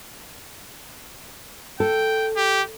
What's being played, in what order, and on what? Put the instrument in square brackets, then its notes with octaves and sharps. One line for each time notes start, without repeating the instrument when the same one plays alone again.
[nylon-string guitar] A4 [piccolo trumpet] G5
[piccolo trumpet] G4